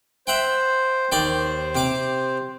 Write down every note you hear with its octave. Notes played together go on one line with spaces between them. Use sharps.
C5 E5 F#5 G5
D#2 C5 D5 G5
C3 D6